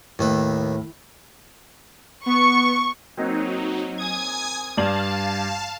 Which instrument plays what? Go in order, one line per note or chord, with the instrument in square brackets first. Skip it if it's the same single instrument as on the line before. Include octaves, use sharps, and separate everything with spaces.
[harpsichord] D#2 D#3 B4 [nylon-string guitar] A2
[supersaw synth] B3 [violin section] C#6
[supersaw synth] F#3 D#4 [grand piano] A#3 C4
[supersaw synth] G#5 D#6 G#6
[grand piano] G2 D5 F#7 [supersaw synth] F5 A5